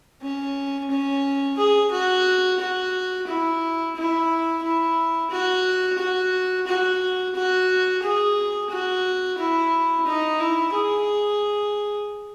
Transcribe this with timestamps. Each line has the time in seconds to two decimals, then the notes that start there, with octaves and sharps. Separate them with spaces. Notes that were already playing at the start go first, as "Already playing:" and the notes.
0.22 C#4
0.90 C#4
1.57 G#4
1.91 F#4
2.60 F#4
3.27 E4
3.96 E4
4.63 E4
5.31 F#4
5.98 F#4
6.67 F#4
7.35 F#4
8.02 G#4
8.70 F#4
9.38 E4
10.06 D#4
10.39 E4
10.74 G#4